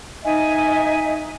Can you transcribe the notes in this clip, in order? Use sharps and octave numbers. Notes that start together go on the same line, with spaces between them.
D#4 D#5 E5 G#5